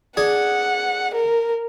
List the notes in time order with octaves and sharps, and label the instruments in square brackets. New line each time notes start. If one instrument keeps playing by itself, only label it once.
[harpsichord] D4 G#4 [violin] F#5
[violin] A#4